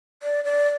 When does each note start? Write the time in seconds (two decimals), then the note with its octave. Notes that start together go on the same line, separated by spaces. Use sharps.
0.23 D5
0.45 D5